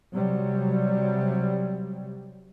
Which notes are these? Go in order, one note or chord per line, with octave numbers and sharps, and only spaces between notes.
C3 F#3 G3